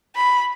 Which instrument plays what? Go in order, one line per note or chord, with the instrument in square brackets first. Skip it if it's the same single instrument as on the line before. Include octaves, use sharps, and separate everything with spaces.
[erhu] B5